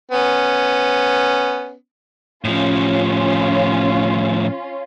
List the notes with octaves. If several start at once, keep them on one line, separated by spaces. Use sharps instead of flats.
B3 C#4
A2 F3 C#4 F4